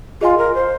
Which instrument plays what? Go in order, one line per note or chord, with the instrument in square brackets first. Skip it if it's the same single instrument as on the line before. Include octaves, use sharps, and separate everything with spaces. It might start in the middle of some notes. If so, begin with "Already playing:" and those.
[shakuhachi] F4 [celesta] G#4 D#5 G#5 C6
[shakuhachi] A#4
C5